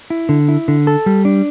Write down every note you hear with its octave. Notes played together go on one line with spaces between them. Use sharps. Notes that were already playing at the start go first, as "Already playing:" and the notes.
E4
D3
E4
D3
A4
G3
D4